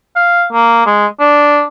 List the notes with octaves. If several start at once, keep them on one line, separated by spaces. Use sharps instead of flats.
F5
A#3
G#3
D4